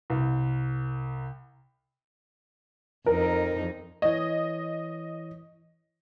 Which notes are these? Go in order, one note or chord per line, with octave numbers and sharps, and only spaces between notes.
C2
F2 D#4 A#4
E3 C#5 D#5